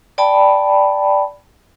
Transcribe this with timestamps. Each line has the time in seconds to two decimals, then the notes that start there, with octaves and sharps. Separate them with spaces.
0.18 D5 G5 A5 B5